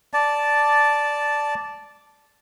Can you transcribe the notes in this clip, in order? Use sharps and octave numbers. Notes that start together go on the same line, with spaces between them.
D5 A5